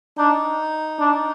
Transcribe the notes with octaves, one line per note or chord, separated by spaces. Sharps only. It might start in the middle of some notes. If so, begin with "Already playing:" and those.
D4 D#4
D4